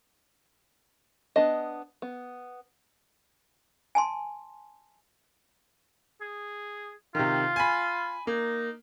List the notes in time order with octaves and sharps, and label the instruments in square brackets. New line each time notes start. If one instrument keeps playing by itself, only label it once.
[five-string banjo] B3 D4 D#5
B3
[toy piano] G#5 A5 C6
[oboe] G#4
[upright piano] C3 D#3 [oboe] F4
[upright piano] G#5 B5
[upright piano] A#3 [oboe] D#4